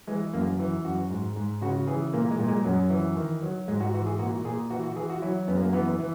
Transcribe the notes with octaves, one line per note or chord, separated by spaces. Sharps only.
E3 G#3
F#2 A#3
E3
F#2 F#4
G#2
G#2
C#3 F#4
E3 G#4
A#2 A#3
G#3
A#2
G#3
F#2 F#3
E3
D#3
F#3
G#2 G#3
F#4
E3 F#4
G#4
A#2 F#4
A#2 G#4
E3 F#4
F#4
E3 G#4
F#4
F#3 E4
F#2 B3
A#3
E3 B3
E3